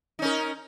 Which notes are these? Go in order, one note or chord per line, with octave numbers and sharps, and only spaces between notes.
C#4 D#4 A#4